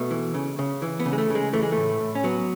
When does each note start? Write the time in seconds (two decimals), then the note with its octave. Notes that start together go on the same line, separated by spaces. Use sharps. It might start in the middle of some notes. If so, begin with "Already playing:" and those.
Already playing: B2 A3
0.11 E3
0.34 C#3
0.59 C#3
0.82 E3
1.00 B3
1.06 C#3
1.13 G#3
1.18 A3
1.30 C#3
1.35 G#3
1.53 E3 A3
1.63 G#3
1.72 A2 A3
2.00 A2
2.15 C#4
2.24 F#3 B3